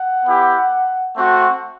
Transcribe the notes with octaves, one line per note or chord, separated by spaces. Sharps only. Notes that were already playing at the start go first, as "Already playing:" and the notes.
Already playing: F#5
B3 E4 G4
A3 C4 F#4